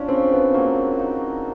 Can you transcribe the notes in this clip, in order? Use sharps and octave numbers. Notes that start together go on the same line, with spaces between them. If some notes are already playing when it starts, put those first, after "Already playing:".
Already playing: F3 C#4 D4
C#3 C4
B3
F#3 A#3
D#4